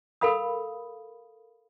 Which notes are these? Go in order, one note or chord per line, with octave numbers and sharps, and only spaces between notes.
A4 A#4 F5 B5 D#6